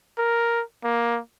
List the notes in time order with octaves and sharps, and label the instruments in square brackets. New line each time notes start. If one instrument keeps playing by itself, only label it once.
[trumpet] A#4
A#3